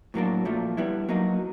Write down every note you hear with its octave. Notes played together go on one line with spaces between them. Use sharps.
A2 F#3 A#3 D4
A#2 F3 A3
G3 B3 E4
F#3 A#3 D#4